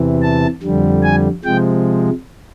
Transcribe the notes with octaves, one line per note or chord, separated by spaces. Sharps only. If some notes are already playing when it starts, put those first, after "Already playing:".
Already playing: E2 C3 E3
A5
F2 D3 G3
G#5
C3 F3 G#3 G5